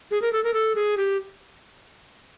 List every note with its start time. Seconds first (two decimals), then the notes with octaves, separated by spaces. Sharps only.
0.11 G#4
0.22 A#4
0.33 A4
0.44 A#4
0.54 A4
0.75 G#4
0.97 G4